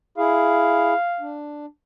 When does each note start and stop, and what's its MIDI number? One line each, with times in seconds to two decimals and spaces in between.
0.18 0.94 64
0.18 0.94 68
0.18 1.36 77
1.20 1.66 62